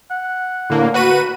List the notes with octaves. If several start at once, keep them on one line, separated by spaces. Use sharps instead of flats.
F#5
A2 D3 A#3
F#4 B4 F#5 D#7